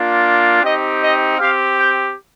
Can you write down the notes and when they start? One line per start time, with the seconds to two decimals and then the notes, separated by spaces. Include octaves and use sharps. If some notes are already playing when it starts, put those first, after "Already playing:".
Already playing: A#3 D4 F4
0.62 C4 D#4 G4 D#5
1.01 D#5
1.39 C4 G4 F5
1.77 G5